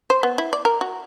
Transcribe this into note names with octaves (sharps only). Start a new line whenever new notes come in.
C5
B3
E4
D5
A#4
F#4